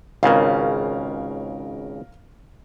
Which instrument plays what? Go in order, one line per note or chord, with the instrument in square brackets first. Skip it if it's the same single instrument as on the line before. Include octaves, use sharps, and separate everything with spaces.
[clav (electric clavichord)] G#1 C#2 C#3 [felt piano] A#4 F5